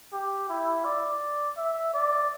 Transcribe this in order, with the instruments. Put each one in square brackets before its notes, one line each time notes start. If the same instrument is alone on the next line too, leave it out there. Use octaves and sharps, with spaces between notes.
[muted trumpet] G4
E4
D5
E5
D5